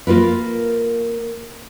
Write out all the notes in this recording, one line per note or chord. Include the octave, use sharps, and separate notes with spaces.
A#3 F4 A#4 B4